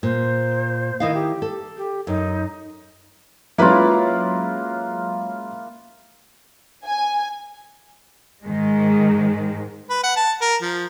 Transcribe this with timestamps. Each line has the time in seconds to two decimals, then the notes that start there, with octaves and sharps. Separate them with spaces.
0.03 A#2 C5
1.00 D#3 E4 D#5 F5
1.14 G4
1.42 A4
1.77 G4
2.07 F#2 D#4
3.58 F#3 G#3 A#3 C#4 E4 F4 B4
6.85 G#5
8.44 G#2 D#3 G#3
9.90 B4
10.03 F#5
10.16 A5
10.41 A#4
10.62 F3